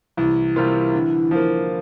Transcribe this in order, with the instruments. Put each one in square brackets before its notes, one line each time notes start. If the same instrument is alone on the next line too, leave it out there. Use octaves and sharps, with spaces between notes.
[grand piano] C2 [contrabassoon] E3
[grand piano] C3 G3 A#3 F4
D3
F3 A#3